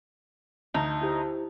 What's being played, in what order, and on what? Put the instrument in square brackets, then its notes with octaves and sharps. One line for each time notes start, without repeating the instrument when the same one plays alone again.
[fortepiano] D2 [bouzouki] D#4
[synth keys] E4 G4 C5